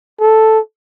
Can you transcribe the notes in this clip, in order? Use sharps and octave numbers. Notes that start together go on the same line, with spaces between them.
A4